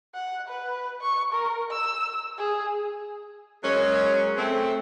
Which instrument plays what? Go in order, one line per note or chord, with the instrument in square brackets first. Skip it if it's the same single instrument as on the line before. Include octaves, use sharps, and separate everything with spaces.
[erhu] F#5
B4
C#6
A#4
E6
G#4
[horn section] F#3 G#3 A#3 C#4
A3 C4